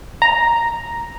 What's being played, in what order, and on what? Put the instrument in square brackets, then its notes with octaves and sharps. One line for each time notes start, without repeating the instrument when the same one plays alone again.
[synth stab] A#5